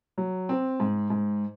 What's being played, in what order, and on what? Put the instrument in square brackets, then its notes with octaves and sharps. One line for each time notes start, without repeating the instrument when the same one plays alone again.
[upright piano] F#3
C4
G#2
G#2